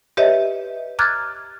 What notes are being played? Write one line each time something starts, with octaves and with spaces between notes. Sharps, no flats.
G4 B4 C#5 D#5 E5
A#5 D6 F6 F#6 G#6 A6